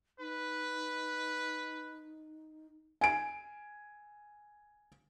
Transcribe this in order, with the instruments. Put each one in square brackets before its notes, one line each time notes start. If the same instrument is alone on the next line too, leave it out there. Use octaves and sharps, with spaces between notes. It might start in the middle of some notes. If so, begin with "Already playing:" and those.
[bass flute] D#4 [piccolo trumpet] B4
[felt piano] G#5 D7